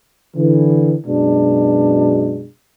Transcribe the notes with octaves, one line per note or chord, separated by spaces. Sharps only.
D3 E3
F#2 B2 G#3 D4